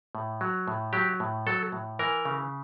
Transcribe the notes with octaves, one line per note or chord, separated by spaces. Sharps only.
A2
F#3
A2
F#3 G4
A2
F#3 A4
A2
E3 A#4
C#3